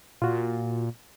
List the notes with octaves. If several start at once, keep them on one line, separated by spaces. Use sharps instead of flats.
A#2 F4 F#4